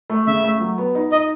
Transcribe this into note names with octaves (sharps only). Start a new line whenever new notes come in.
A3
C#3 E5
A3
F#3
B3
D#4
D#4 D#5